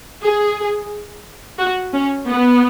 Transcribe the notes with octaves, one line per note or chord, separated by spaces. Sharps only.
G#4
F#4
C#4
B3